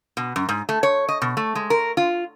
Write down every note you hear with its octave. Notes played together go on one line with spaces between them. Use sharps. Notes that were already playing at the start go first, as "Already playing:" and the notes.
B2
F#2
G#2
A3
C#5
D#5
B2
A3
G#3
A#4
F4